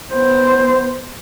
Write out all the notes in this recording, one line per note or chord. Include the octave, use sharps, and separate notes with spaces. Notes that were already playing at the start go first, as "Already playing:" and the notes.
B3 C5